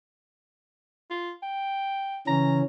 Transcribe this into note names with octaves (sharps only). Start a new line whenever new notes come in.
F4
G5
C#3 E3 C#4 A#5